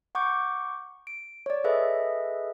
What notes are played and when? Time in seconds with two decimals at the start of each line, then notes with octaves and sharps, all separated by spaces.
0.15 F#5 C#6 D6 G6
1.07 D7
1.46 C#5 D5
1.64 G#4 A4 B4 D#5 E5